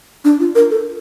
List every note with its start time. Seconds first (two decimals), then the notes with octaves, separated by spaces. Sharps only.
0.25 D4
0.40 F4
0.55 A#4
0.71 A4